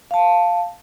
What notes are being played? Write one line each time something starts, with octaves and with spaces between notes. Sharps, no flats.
F5 A5